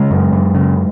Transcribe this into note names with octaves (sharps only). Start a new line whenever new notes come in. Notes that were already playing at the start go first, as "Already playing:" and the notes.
Already playing: C#3 G#3
F#2
F#2
C#3